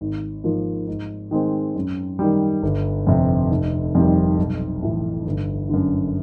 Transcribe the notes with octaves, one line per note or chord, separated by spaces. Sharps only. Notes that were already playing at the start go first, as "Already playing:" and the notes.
G#1
G#2 F3 A#3
G#2
D#3 G#3 C4
F#2
D#3 G3
G1
F2 C3
F1
F2 C3 D#3 G3
B1
A2 E3
G1
F#2 D3